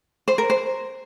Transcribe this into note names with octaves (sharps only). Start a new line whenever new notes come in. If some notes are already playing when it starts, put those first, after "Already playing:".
C5
A#4
C5